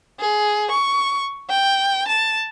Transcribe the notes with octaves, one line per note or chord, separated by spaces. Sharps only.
G#4
C#6
G5
A5